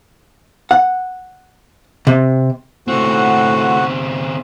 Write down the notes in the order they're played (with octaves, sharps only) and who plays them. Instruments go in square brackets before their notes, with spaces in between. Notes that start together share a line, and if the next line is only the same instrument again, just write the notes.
[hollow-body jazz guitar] F#5
C3
[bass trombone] A2 [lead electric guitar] C#3 C4 [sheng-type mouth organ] F#4 F#5